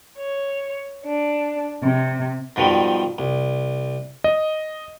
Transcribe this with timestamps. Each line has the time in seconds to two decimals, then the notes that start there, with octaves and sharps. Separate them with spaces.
0.17 C#5
1.05 D4
1.83 C3
2.56 G#2 B2 D#3 F3 G3
3.18 C2
4.24 D#5